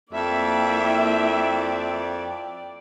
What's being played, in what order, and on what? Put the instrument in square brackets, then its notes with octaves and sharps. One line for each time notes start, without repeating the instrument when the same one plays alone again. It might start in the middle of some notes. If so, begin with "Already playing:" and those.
[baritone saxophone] F2 [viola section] A#3 E4 E5 [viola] D5 G5